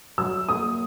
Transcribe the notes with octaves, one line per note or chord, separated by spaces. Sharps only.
F#3 E6
A#3 D#6